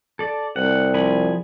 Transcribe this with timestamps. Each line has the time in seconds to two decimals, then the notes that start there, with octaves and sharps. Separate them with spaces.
0.19 A4 D5
0.56 C2 F#5
0.94 F3 G#4 B5